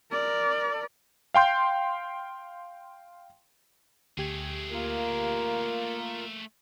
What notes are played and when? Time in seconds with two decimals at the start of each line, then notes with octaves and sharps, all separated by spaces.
0.11 A#4 D5
1.34 F5 G5 C6 G6
4.18 D2 A3 G4 G#4 G#6
4.72 A#3 F4 A#4